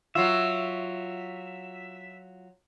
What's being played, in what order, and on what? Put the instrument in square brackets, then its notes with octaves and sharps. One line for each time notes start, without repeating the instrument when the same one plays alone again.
[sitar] F#3 F4 [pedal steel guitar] E5